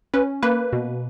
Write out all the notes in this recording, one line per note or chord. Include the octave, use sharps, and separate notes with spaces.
C#4 B4
A#3 B4
B2